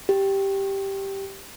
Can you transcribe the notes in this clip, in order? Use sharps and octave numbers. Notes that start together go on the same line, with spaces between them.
G4